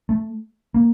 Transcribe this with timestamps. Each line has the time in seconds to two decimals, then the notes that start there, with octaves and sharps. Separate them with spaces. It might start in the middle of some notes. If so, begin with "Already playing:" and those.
0.09 A3
0.74 A#3